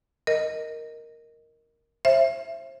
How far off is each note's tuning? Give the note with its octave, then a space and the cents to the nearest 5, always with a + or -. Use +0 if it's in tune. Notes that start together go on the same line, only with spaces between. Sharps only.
A#4 -5 D#5 +0
C5 +40 E5 +20